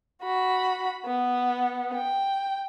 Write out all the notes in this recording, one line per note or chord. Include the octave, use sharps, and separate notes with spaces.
F#4 B5
B3
G5